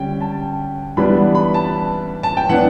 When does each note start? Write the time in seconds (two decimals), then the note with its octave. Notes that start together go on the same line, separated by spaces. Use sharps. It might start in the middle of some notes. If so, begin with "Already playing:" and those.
Already playing: D3 G3 C#4 G5
0.21 A5
0.97 E3 G3 B3 D4 B5
1.35 B5
1.54 A5
2.23 A5
2.37 G5
2.49 E3 B3 D4 F#5